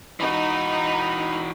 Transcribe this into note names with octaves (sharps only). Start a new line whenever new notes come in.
E3 D#4 F#4 B5